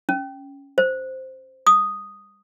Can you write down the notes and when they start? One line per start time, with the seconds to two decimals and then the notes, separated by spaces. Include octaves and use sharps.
0.09 C#4
0.78 C5
1.67 D#6